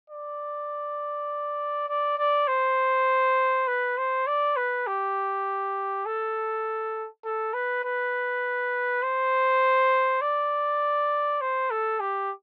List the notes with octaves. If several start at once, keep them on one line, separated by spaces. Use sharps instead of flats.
D5
D5
D5
C5
B4
C5
D5
B4
G4
A4
A4
B4
B4
C5
D5
C5
A4
G4